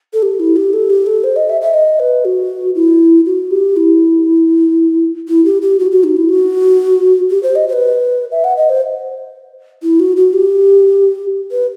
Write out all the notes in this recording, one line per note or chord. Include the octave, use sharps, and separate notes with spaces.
A4
G4
E4
G4
A4
G4
A4
C5
D#5
E5
E5
D#5
B4
F#4
E4
F#4
G4
E4
E4
G4
G4
F#4
F#4
D#4
E4
F#4
G4
C5
D#5
C5
B4
E5
F#5
D#5
C5
E4
F#4
F#4
G4
B4